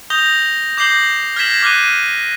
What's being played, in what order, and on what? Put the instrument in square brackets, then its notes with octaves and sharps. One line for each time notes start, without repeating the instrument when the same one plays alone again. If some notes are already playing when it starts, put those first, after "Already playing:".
[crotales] D#6 G6 A#6 F7 G7
D6 G6 A#6 C7 F#7 G7
F6 G#6 A#6 B6 E7 F#7
D6 F6 F#6 D#7